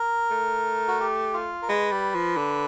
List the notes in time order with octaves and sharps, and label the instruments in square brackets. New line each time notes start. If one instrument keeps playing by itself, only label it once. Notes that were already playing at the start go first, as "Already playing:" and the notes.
Already playing: [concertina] A#4
[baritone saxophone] A3
[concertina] F#4
G4
F4
A#4
[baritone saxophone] G#3 [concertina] B4
[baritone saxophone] G3
F3
D3